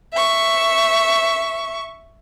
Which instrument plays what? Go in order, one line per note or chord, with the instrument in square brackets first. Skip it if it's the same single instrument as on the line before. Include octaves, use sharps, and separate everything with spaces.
[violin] E5 C#6